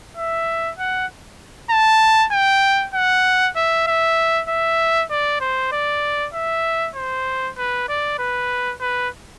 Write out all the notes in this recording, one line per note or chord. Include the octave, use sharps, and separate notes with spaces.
E5
F#5
A5
G5
F#5
E5
E5
E5
D5
C5
D5
E5
C5
B4
D5
B4
B4